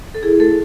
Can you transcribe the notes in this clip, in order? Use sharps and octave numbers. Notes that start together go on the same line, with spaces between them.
A4
E4 G#4
A3 A4